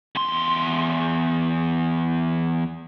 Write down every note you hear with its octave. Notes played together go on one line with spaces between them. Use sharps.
E2 C6